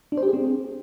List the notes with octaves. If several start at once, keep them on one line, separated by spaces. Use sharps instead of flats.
D4
C5
G4
G#4
C4